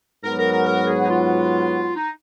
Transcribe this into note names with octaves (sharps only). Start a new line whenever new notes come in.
G#2 F#3 B3 F#4 A#4
A#4
A#4
A#4
G#4
D#4
F4
D#4